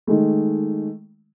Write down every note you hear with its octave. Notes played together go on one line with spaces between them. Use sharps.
D#3 G#3 A3